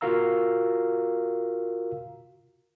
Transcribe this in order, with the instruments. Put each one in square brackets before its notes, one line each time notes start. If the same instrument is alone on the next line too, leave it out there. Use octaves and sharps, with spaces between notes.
[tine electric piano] F4 F#4 A#4 F5 A#5 E6